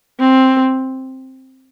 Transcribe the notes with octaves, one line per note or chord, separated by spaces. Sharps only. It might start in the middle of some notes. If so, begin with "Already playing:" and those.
C4